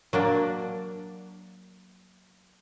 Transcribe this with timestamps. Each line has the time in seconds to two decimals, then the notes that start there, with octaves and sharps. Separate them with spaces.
0.13 F#3 A#3 D4